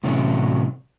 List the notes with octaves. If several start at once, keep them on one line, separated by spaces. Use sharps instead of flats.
A2 C3 E3 F#3 A3 C#4